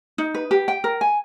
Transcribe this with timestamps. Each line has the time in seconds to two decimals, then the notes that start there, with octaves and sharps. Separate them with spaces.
0.18 D#4
0.35 B4
0.51 G4
0.68 G5
0.84 A#4
1.01 G#5